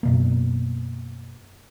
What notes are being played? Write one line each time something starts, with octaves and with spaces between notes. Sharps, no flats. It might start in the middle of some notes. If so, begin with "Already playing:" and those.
F#2 B2 A#3